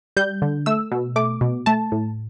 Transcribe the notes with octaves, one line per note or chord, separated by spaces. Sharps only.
G3 G6
D3
A3 E6
B2
A3 D6
B2
A3 A5
A2